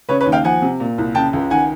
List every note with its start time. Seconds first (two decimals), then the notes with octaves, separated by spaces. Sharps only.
0.09 C#3 B4 C#5
0.21 B4 C#5
0.26 D#2
0.32 F5 G5
0.44 F3 F#5 G#5
0.62 C3
0.80 A#2
0.98 C2
1.15 C#3 G5 A5
1.33 C#2
1.50 D#3 F#5 G#5